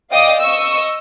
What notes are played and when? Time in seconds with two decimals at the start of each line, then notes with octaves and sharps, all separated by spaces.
0.11 D5 D#5 F5 G5 D6 D#6
0.40 D#5 C#6 E6